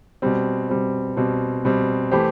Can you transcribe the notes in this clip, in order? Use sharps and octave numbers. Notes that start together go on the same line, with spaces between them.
B2 G3 C4
B2 G3 C4
B2 G3 C4
B2 G3 C4
E3 A3 E4 G4 C5